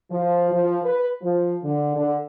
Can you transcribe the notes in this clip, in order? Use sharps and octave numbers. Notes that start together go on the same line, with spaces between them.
F3
F3
B4
F3
D3
D3